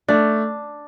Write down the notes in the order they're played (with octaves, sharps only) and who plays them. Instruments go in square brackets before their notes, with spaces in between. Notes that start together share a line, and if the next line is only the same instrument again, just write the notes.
[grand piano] A3 [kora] D4